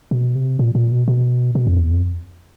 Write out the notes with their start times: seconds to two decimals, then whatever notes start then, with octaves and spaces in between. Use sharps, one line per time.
0.11 B2
0.35 C3
0.59 A#2
0.75 A#2
0.92 B2
1.08 B2
1.55 B2
1.67 F2
1.80 E2
1.92 F2